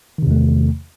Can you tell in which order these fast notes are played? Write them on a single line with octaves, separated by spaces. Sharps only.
D#3 C3 E2 A3